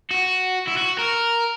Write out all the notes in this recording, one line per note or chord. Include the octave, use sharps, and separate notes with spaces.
F#4
E4
F#4
A#4